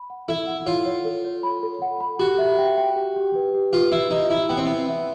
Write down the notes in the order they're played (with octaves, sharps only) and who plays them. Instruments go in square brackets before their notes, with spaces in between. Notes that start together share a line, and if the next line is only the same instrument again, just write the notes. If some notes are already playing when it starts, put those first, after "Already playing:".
Already playing: [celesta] B5
F#5
[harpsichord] E4 [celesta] A4
[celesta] F#5
[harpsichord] F4 [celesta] C#5
[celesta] C#5
A4
C#5
B5
A4
F#5
B5
[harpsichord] F#4 [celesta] G4
[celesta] E5
G5
G5
G4
G4
B4
G4
[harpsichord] F4 [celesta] B4
[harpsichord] E4 [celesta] E5
[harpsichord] D#4 [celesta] G4
[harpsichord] E4 [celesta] E5
[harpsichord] B3 [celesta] G5
[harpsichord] C4
[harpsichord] B3 [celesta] G5
[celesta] E5